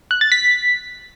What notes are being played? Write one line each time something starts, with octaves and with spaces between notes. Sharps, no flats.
F#6
A6
B6